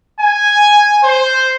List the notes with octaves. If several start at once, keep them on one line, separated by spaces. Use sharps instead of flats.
G#5
C5